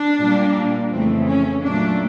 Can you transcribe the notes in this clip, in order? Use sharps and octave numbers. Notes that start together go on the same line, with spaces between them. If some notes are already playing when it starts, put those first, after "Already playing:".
Already playing: D4
A#2 G3 A#3
F2 C#3 E3 A3 C4
C#4
A#2 F#3 A3 D4